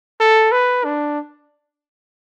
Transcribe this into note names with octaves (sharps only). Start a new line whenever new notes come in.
A4
B4
D4